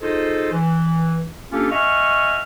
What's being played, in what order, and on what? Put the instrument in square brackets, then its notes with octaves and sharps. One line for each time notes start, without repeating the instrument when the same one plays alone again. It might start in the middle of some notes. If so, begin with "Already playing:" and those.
[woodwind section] D#4 F4 G#4 A4 C5 D#5
E3
A#3 C#4 D4 F4 G4 A4
D#5 E5 F#5 G#5 C#6 F6